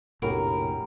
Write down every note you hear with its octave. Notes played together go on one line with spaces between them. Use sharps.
F1 A#1 A2 F#3 G3 A#4 G#5